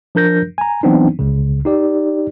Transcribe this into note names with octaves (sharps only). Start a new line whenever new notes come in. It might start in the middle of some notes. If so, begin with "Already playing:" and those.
F3 D4 A#4 G6 A#6
G#5 A#5
E3 F#3 B3 C4 D4 D#4
C#2 C#3
D#4 G4 D5